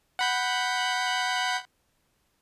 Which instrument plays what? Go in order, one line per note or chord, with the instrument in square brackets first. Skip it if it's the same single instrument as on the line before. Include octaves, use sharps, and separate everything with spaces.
[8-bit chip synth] F#5 B5 G6